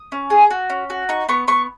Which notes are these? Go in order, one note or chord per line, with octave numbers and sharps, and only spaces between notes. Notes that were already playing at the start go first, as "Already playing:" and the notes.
Already playing: D#6
C#4
G#4
F#4
C#4
F#4
D#4 C#6
B3 C#6
B3 C#6